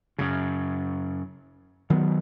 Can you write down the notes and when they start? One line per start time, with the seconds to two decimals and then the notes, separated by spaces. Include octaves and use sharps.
0.18 F#2 C#3
1.90 D#3 F#3 B3